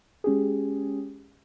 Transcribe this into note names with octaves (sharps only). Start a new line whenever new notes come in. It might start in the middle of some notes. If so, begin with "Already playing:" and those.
G#3 C#4 G4 G#4